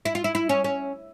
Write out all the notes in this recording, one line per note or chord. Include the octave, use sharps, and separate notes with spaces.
E4
F4
E4
E4
C#4
C#4